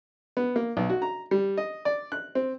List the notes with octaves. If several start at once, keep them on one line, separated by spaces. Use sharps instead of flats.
B3
A#3
B1
F#4
A#5
G3
D#5
D5
F#6
C4